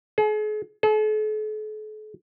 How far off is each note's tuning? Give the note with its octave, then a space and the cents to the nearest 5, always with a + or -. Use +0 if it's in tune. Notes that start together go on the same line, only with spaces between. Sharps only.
G#4 +40
A4 -45